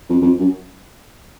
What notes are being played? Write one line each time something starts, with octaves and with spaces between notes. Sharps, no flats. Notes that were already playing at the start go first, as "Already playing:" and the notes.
F2
F2
F#2